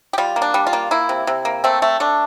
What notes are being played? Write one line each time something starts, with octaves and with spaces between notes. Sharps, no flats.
G4
G3 F4
A#3
D4
G3
F4
A#3
A#3 E4
C3
C3
A#3
A3 C4
A3
A3 D4